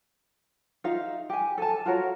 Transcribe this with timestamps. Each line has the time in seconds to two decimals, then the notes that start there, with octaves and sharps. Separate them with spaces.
0.84 D#4 F4 E5 F5
1.29 G4 G#5
1.58 A4 G#5 A5
1.86 F4 F#4 A#4 C#5